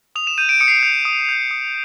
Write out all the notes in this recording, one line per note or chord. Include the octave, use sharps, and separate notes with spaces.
D#6 F7
E7
G6 D#7
D7
D#6 C#7
C7
C#7
G6
D#6
G6
D#6